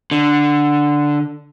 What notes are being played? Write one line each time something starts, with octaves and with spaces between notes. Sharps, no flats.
D3